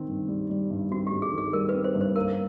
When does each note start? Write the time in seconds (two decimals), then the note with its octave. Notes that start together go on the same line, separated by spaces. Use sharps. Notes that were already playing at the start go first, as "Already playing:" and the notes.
Already playing: D#3 C4
0.08 G2
0.28 G3
0.50 G3
0.70 G2
0.92 C4 F#4
1.07 G4
1.12 G2
1.22 G#4
1.32 D#3
1.38 G#4
1.53 G3 A#4
1.69 B4
1.75 C4
1.84 C5
1.95 G2
2.01 C5
2.16 A#3 A#4